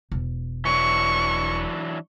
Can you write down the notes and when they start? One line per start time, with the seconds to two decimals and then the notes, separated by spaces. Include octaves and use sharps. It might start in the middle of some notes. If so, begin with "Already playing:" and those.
0.12 E1
0.65 E3 F#3 D4 C#6